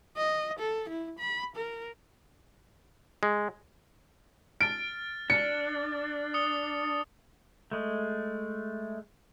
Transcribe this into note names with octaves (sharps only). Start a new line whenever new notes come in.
D#5
A4
E4
B5
A#4
G#3
F6 A6 D7
D4 A6 C#7
D#6 C#7 G7
G#3 A3